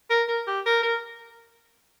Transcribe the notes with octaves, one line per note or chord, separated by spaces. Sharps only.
A#4
A#4
G4
A#4
A#4